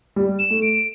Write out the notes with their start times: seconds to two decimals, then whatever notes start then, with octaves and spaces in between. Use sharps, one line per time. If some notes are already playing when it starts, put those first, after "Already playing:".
0.16 G3
0.39 E7
0.50 A3
0.62 D7